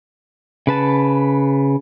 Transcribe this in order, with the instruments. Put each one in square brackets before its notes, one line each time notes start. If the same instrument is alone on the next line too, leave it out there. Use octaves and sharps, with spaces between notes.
[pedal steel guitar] C#3 B4 A5